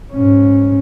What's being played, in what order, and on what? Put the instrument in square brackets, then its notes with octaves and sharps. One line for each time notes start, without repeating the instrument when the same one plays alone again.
[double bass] G#2 C#4